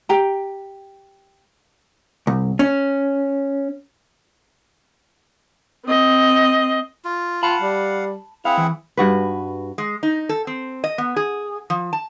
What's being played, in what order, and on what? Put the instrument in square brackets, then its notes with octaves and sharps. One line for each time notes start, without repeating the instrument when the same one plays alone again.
[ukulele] G4 G5 A#5
[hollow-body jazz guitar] C2
C#4
[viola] C4 D#5
[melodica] F4
[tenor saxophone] F4 [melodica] F5 F#5 [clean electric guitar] A5 B5
[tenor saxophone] G3
[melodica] C4 G#4 F#5 [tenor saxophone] E4 [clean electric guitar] F5
[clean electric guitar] E3
[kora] G2 F#4 B4
[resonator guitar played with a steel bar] G#3
D#4
A4
C4
D#5
B3
G#4
F3
A5